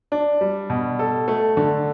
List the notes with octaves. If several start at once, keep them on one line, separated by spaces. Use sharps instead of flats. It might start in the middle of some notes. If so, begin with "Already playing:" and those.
D4
G3
B2
A4
A3
D3